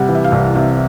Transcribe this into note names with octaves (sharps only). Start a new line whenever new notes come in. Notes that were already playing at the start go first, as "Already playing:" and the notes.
Already playing: C3 G3 F#5
E3
E5
F5
C2
C3 F5